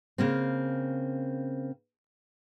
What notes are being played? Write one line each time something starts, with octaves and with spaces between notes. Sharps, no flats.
C#3 A#3 C4